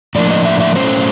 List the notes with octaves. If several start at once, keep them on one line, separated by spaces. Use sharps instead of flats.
A2 F3 A#3 D4 D5
D#5
E5
E5
A2 F#3 A3 C#4 C5